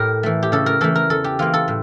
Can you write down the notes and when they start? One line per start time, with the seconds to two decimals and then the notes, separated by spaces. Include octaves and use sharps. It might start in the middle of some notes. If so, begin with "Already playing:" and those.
Already playing: A2 G4 A#4
0.23 E3 A3
0.43 G4
0.52 C#3 A4
0.66 A#4
0.81 E3 A3 A4
0.95 A#4
1.10 E2 A4
1.24 G4
1.39 E3 A#3 F4
1.54 A4
1.68 A2